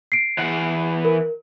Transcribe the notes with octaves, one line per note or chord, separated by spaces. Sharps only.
C7 D7
E3 F#5
A#4